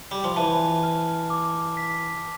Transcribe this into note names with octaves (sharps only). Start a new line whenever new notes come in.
G3
F3
E3 A5
F6
D6
B6